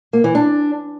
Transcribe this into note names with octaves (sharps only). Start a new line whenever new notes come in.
A#3
E3
D4